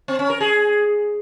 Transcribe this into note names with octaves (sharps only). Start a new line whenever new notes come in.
C4
C#4
A#4
G#4